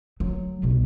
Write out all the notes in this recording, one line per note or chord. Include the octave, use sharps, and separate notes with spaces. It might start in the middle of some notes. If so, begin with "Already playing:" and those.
F#3 A3
C2 B2